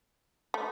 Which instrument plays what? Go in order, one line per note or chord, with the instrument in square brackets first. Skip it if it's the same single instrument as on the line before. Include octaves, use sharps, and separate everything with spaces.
[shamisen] A3